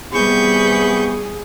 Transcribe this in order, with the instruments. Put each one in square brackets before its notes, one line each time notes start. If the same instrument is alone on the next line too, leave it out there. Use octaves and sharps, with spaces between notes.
[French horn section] C3 B3 [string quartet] G3 C#6 G6 [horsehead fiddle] G#4 [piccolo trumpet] B5